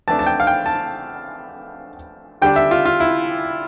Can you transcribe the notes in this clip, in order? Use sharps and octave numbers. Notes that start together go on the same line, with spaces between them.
F2 E3 A3 D4 A5
A5
G5
F5
G5
A5
D3 G3 D4 G5
E5
F4
F4
E4